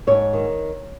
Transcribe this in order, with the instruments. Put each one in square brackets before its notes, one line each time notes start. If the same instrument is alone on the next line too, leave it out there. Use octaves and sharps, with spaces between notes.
[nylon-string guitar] G#2 C#5
D#3